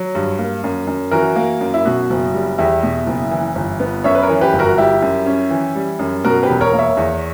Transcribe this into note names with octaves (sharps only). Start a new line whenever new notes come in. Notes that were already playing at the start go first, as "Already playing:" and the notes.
Already playing: F#3
G2
A#3
F#2
F#2
E3 F#4 A#4
A#3
F#2
E4
B2 F#4
F#1
G3
E2 E4 G4
B2
F#1
E3
G1
B3
F#2 C#5 E5
B4
A#4 C#5
E3
G4 B4
G1
F#4 A#4
G3 E4 G4
F#2
C#4
E3
G3
F#2
B2 F#4 A#4
G4 B4
E1
A#4 C#5
A#3
C#5 E5
E2